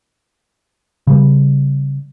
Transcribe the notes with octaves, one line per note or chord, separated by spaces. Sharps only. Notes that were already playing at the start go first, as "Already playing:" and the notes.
C#3 G3